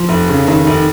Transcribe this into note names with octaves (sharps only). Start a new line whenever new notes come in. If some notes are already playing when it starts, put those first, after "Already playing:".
Already playing: F3
F1
C#3
F1 D#3
F1